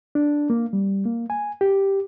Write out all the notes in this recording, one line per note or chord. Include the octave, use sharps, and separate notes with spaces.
D4
A#3
G3
A#3
G#5
G4